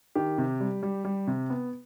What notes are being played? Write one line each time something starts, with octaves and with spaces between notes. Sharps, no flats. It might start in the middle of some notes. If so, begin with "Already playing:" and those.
D#3 G4
C3
G3
G3
G3
C3
B3